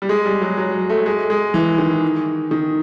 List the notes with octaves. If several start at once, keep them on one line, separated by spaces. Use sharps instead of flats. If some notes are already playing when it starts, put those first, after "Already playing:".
G3
G#3
G3
F#3
F#3
A3
G#3
G#3
E3
D#3
D#3